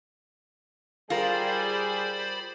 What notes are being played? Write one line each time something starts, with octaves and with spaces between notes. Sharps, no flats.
G3 F4 G#4 A#4 C5 D5 B5